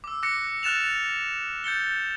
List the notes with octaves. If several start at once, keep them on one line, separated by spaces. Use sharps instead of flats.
D6 E6
D6 F#6 A#6 C#7
F6 F#6 A6 E7 F7
G6 A6 C#7 G7